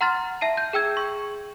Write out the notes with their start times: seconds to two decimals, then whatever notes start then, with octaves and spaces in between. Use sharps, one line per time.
0.01 F#5 A#5 C6 F6 A6
0.41 E5 A5 C7 D#7
0.57 G6
0.73 G#4 G5 E6 G#6
0.97 C#6